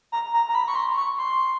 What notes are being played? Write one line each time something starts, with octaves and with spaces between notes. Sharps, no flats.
A#5
A#5
A#5
B5
C#6
C6
C#6
C6